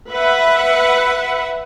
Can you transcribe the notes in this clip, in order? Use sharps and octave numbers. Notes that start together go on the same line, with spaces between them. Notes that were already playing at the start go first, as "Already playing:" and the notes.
B4 E5 F#5